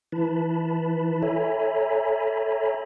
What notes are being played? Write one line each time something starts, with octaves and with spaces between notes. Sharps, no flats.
E3 E4 B4 A5 B5
A4 C#5 E5 G#5 A#5 B5